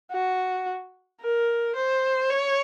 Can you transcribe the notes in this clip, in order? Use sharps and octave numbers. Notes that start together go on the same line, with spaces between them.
F#4
A#4
C5
C#5